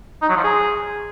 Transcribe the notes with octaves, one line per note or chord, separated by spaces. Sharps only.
D#4
F#3
F3
G#4